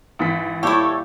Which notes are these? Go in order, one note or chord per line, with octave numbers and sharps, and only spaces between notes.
G#1 E3 B6
A#2 G3 E4 G4 A4 C#5 G6